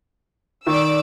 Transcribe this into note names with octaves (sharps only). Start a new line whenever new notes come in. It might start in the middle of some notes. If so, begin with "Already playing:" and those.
D#3 D5 D6 E6